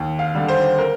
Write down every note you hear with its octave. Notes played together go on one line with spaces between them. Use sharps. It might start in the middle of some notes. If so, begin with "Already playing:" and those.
Already playing: D#2
F5
D3 G3
C5
A#4